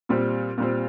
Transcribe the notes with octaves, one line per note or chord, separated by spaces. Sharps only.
A#2 G3 C4
A#2 G3 C4